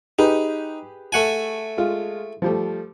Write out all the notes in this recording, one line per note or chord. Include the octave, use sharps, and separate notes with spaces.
D#4 G4 G#4 B4
A3 F#5 G#5
G#3 F4
F3 G3 A3